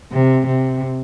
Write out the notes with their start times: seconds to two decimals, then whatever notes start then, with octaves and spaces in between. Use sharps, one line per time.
0.12 C3
0.47 C3